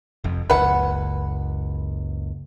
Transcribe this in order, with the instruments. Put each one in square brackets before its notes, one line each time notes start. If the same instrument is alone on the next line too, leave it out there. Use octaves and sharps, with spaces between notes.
[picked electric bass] F1 F2
[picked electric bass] F#1 C#2 [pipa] B4 F#5